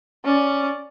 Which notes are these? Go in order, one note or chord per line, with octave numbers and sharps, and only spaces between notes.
C#4 D5